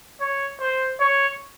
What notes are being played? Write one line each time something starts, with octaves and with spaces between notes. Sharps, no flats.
C#5
C5
C#5